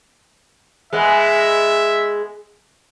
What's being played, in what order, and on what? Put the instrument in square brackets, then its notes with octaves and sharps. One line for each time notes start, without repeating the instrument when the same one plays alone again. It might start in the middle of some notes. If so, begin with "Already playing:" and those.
[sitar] G#3 B3 [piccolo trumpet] E5